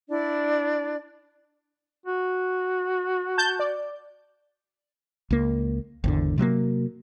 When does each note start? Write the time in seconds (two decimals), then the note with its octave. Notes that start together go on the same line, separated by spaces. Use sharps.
0.09 D4 E4 D5
2.06 F#4
3.38 A5 G6
3.59 D5
5.31 C#2 A#3
6.04 G#1 E2 D3
6.38 C3 F#3 G3 A#3